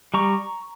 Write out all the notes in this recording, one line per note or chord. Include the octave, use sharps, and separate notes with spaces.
G3 A#5 C#6